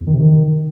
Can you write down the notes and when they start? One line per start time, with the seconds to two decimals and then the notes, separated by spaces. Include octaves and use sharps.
0.01 E2
0.07 D#3
0.13 C3
0.19 D#3